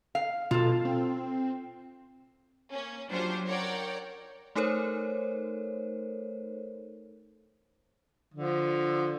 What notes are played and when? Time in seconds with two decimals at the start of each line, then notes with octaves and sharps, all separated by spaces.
0.15 F5
0.51 B2 F4 A4
0.85 C4
2.71 A#3 C#4
3.10 F#3 C#4 D4 F4 G4 C5
3.48 A#4 C#5 D5 F#5 G5
4.55 A3 D#4 A4 A#4 C5 C#5
8.34 D3 F3